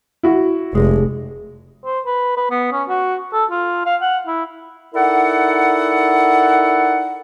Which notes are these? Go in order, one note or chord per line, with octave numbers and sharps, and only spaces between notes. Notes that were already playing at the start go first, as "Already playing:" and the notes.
E4 F#4
F1 G#3
C5
B4
B4
B3
C#4
F#4
A4
F4
F5
F#5
E4
D#4 E4 A4 A#4 D5 F#5